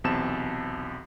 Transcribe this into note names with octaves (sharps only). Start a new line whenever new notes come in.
B1 E2 C3 C4 A5 E7